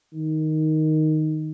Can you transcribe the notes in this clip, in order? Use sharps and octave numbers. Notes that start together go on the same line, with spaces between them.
D#3